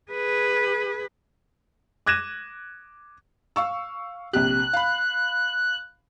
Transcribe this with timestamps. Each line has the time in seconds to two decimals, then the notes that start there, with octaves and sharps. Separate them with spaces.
0.12 G#4 B4
2.06 D6 F#6 G#6 A#6 D#7 E7
3.56 F5 C#6 E6
4.33 A#1 C3 G4 F#6
4.73 F5 B5